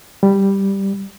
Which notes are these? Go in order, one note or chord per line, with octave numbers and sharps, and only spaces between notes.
G3